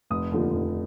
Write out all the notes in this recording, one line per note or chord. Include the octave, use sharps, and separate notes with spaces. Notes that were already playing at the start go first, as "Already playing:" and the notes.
F1 D#6
D#2 D3 F3
F1